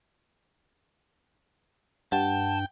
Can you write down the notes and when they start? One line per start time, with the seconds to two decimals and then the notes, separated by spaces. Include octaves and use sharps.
2.12 G2 F#5 G5 A5